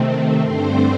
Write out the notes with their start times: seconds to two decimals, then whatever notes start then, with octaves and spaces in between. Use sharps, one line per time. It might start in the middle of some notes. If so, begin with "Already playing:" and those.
Already playing: C3 D#3 A3 C4
0.39 G2 D3 A3 C4 C5